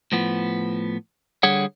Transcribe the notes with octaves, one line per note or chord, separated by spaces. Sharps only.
A2 F3 B3
D3 G3 G#4 C#5 F#5